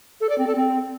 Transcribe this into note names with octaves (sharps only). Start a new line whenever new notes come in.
A4
D5
C4
A4
C4